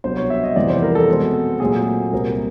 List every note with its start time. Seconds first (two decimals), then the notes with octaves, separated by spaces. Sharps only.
0.04 C2 B2 F#3 B3 D4 C5
0.17 C#5
0.30 E5
0.44 D#5
0.56 F2 C3 E3 G3 B3 D5
0.70 C5
0.82 A#4
0.95 A4
1.08 B2 G#3 C4
1.60 A#2 F#3 A3 C4 G#4
2.13 C2 A#2 G3 C4 A#4